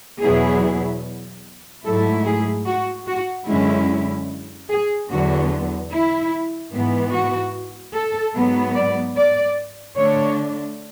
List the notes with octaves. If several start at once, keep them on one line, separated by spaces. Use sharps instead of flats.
E2 B2 F#3 B3 E4 G#4
G#2 F#3 A3 E4 A4
G#4
F#4
F#4
F#2 D3 G#3 C#4 E4
G#4
E2 D3 F#3 B3 F#4
E4
G#2 E3 B3
F#4
A4
G#2 F#3 B3
D5
D5
D3 A3 D4 C#5